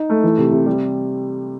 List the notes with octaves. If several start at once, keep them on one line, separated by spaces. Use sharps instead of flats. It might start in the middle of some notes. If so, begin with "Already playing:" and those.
Already playing: D#4
A3
E3
C3
C3
G3